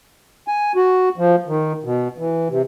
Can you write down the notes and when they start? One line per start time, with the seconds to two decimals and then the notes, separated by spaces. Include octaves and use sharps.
0.48 G#5
0.75 F#4
1.18 F3
1.47 D#3
1.84 B2
2.18 E3
2.49 C3